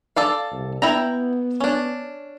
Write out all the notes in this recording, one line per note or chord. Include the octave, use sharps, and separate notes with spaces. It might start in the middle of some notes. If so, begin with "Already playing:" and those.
A4 D5 F5
C2
B3 E4 G5 A#5
C#4 D4